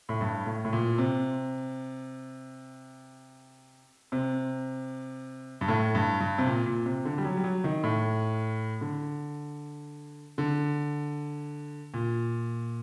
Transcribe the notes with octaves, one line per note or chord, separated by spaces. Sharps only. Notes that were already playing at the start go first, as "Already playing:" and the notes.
A2
G2
A2
A2
A#2
C3
C3
G2
A2
G2
G2
C3
A#2
A#2
C3
D3
G3
F#3
G3
F#3
D#3
A2
D3
D3
A#2